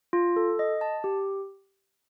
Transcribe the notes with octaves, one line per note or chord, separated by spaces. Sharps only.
F4
A4
D#5
A5
G4